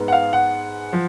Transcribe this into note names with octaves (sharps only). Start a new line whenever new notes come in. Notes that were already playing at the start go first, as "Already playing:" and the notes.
Already playing: G#2 G#3 B3
F#5
F5
F#5
F3